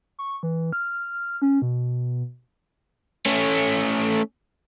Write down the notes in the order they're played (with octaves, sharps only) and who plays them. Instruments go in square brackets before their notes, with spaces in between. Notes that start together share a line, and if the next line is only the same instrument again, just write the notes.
[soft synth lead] C#6
E3
F6
C#4
B2
[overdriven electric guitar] A3 C#4